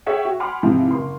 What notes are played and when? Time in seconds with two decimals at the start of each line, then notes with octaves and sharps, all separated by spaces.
0.06 G#4 C#5 E5 F#5 G5
0.25 F#4
0.40 F#5 G#5 B5 C6 D6 F6
0.63 G#2 C3 E3 F3
0.91 F#1 C6